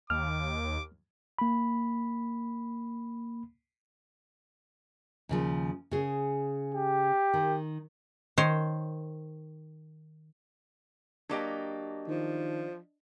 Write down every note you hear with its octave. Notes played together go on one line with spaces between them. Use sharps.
D#2 D6 F6
A#3 B5
D#2 C#3 F3
C#3 G#4
G4
D#3
D#3 C5 C#5
F#3 A#3 D4 G4 D5 D#5
D#3 F3